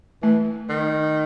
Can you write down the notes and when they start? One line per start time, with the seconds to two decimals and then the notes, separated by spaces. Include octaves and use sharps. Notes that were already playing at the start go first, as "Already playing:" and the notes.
0.22 E3 A3
0.69 D#3